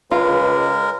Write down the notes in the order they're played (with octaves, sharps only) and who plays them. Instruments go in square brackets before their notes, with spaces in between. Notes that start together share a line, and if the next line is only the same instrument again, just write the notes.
[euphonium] C#2 [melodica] G#3 A#4 [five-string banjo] F4 [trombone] B4